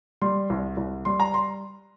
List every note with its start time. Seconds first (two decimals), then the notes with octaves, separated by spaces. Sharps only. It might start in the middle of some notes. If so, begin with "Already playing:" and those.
0.22 G3 C6
0.50 C2
0.77 C2
1.05 G3 C6
1.20 A#5
1.34 C6